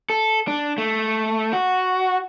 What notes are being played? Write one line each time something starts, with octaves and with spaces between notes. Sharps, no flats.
A4
D4
A3
F#4